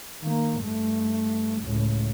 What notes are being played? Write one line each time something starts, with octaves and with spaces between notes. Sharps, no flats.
D#3 A#3
G2 A3
C#2 A2